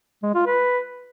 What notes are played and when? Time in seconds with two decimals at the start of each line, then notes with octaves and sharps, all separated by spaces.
0.23 G#3
0.35 F4
0.46 B4